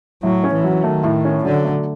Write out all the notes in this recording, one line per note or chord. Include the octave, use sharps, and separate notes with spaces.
A2 F#3
C#4
E3
F#3
D#3 A3
A2
C#4
D3 F#3
A3